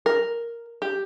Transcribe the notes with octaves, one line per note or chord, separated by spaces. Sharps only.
A#4
G4